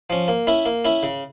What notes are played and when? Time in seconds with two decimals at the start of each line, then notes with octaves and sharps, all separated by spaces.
0.10 F3 C#4
0.28 A#3
0.47 C#4 E4
0.66 A#3
0.85 C#4 E4
1.03 C#3